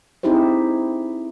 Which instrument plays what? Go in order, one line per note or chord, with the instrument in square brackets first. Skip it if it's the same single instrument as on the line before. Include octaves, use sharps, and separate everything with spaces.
[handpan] C4 D#4 E4 G4 G#4 C5